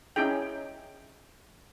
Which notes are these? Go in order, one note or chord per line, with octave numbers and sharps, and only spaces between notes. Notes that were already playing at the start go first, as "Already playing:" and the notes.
C#4 D#4 E4 G#4 G5